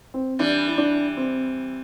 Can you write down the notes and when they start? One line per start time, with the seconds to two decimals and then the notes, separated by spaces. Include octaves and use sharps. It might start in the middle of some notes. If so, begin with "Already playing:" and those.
0.14 C4
0.39 E3 G3 D4
0.67 E4
0.78 D4
1.17 C4